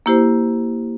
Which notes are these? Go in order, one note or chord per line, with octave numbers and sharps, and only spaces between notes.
A#3 E4 G4 C5